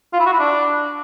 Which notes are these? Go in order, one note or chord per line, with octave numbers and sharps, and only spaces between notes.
F4
E4
F#4
E4
D4